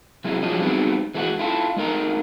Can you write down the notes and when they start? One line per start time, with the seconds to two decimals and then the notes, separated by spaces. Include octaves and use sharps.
0.24 C3 F#3 G#3 E4
0.43 F3 F#3 G#3 D4 F4 D#5
0.59 G3 G#3 B3 C4 D#4 F#4
1.14 E3 G#3 A3 D#4 F#4
1.39 E4 F4 A4
1.76 G#3 A3 D#4 A#4 D#5 A#5